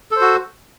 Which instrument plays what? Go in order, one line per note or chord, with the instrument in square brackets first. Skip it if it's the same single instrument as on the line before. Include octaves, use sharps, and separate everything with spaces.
[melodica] A4
C5
F#4